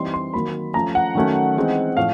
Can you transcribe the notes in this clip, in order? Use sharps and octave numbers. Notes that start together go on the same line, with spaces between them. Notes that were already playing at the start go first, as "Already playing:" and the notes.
Already playing: E3 G3 C4 D#4 C6
C6
D#3 F#3 A#3 B5
F3 A3 C#4 A#5
F#5
D#3 F#3 A3 C#4
E3 G#3 C4 D#4
A2 F3 F5